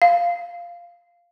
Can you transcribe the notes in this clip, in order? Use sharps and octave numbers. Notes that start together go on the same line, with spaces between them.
F5